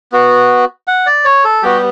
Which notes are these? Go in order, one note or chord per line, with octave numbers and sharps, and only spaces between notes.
B3 F#4
F#5
D5
C#5
A4
G3 B3 F#4 G4